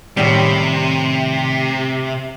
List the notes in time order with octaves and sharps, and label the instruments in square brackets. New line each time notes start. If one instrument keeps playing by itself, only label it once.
[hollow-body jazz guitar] A2 D#3 G3 [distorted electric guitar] C3